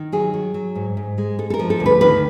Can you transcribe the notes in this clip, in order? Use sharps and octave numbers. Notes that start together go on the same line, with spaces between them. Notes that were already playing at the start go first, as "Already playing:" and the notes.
Already playing: D#3
F#3 G#4
F#3
F#3
G#2
G#2
G#3
G#3 A4
A4
A#4
F3
A4
D2
B4
D#3 B4